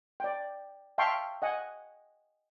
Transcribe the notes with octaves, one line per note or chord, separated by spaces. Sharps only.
D5 G5
E5 F5 G5 A5 C6 C#6
D#5 F#5 G#5